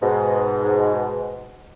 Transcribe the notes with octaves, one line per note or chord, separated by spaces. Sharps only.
G#2 B2